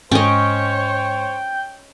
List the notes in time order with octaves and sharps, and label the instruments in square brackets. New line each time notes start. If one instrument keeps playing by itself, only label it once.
[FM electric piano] G#2 [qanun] C#4 D#5 [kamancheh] C5 C#5 [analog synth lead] G5